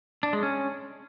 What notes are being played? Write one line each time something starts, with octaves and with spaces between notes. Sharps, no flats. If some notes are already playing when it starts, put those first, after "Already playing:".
D4
G#3
C#4